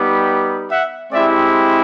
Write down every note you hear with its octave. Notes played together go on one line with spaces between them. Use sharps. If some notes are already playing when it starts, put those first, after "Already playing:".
Already playing: G3 B3 D#4 G4
E5 F#5
G#3 C4 E4 G4 D5 E5